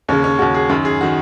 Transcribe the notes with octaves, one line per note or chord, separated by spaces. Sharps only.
D#2 C#3 C#4
C#4
D#2 C#3 F#4
G#4
F#2 D#3
G#4
D#3 F#4